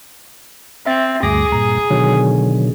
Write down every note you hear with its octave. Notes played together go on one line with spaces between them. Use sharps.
C4 E5 A6
D2 G2 G#4 D6 A#6
G2 A#2 A#5
B2 D3 D#3 F#3